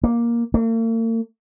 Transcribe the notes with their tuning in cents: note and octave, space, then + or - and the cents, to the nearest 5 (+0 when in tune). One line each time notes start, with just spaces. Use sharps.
A#3 +10
A#3 -45